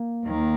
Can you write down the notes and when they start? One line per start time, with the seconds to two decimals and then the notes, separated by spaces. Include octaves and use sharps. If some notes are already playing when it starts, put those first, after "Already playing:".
Already playing: A#3
0.25 D#2 D#3